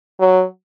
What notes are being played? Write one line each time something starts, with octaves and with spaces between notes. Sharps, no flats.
F#3